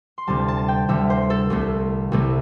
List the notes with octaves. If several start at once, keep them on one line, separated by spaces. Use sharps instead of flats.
C6
D2 C3 G3 A5
A5
A5
G5
D2 C3 G3 E5
C5
A4
C2 C3 A3
C2 C3 A3